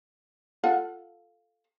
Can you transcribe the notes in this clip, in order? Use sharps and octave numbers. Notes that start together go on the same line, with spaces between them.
F4 A4 F#5